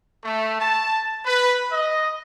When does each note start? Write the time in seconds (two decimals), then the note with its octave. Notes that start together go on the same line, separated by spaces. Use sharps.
0.23 A3
0.58 A5
1.24 B4
1.69 D#5